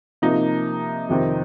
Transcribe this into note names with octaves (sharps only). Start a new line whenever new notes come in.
C3 F3 A#3 D#4
F2 C3 D#3 C4